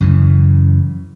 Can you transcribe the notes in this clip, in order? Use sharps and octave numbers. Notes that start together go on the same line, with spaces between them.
F#2 C#3 E3